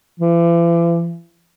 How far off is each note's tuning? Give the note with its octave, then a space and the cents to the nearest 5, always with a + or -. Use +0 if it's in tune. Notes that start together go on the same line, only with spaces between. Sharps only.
E3 +45